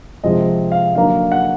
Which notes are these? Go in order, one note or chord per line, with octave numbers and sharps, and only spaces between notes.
C3 F3 G#3 C4 D#5
F5
D3 F#3 A#3 D#4 F5
F#5